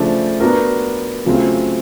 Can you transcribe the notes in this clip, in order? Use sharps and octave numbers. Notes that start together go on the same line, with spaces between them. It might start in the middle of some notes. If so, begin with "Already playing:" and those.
Already playing: C#3 F3 A3 D4
B3 D4 F#4 A#4
C#3 F#3 A3 C4 F4